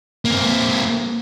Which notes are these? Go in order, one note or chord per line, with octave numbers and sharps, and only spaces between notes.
A#3 C4